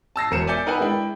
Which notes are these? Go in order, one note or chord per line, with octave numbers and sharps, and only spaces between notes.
A5 E6 A#6 C7
E1 F3 A#4 C5 C#7 E7
D5 E5 G#5 D6 G6 C#7
D#4 A#4 B4 F#5 G#5
G#3 D4 E4 G5